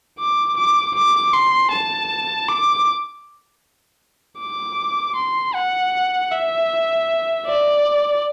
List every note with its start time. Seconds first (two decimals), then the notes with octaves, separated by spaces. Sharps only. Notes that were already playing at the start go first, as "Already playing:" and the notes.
0.19 D6
0.57 D6
0.95 D6
1.33 C6
1.71 A5
2.48 D6
4.39 D6
5.16 C6
5.54 F#5
6.31 E5
7.46 D5